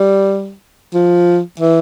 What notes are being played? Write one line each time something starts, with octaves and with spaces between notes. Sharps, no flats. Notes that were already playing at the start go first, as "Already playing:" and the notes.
Already playing: G3
F3
E3